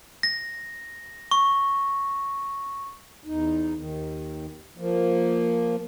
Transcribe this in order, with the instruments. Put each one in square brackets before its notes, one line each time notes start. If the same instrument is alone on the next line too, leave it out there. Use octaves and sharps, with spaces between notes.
[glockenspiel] A#6
C#6
[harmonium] E2 D#4
D#2 D#3
F3 A#3